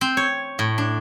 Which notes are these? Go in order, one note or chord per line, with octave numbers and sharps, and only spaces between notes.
C4
C#5
A2
D4